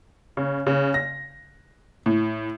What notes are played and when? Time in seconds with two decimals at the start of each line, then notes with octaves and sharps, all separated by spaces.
0.37 C#3
0.67 C#3
0.94 A#6
2.06 A2